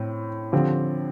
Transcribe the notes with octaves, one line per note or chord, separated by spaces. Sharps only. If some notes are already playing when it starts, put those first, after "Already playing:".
Already playing: A2 C4
D3 F3 C4 G4